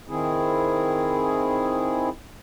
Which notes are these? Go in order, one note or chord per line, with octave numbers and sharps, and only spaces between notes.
D#3 C4 E4 G#4